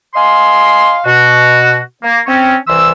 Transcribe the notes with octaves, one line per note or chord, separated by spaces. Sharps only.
D#5 F5 G#5 C6
B2 F#4
A#3
C4 C#4
C2 E3 C6 E6